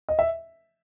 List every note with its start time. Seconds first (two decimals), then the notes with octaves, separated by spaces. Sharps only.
0.09 D#5
0.19 E5